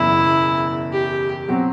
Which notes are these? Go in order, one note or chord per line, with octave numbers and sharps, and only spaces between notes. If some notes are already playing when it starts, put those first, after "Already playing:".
Already playing: F#1 E2 B2 F#3 E4
G4
B2 F#3 C4 F#4